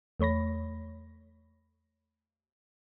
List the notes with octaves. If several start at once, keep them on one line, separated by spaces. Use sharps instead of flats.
E2 A3 C#5 B5 A#6